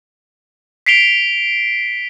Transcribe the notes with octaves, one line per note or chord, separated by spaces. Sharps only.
B6 C7 D7 F7 G7